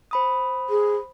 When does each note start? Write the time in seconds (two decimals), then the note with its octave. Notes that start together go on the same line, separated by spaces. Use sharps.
0.11 C5 B5 D#6
0.69 G#4